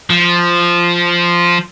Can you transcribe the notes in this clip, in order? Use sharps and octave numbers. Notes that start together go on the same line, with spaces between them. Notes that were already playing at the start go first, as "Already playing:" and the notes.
F3